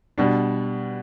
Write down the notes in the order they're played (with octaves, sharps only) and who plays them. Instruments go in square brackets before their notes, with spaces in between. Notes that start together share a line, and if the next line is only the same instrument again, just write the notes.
[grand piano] B2 G3 D4